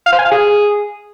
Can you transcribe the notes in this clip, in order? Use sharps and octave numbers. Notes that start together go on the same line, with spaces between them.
F5
C5
G#5
F5
G#4